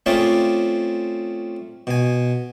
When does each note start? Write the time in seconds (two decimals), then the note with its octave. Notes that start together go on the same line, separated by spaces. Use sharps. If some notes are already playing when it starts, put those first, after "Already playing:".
0.06 A3 C4 C#4 F4 G#4 D5
1.87 B2 G#5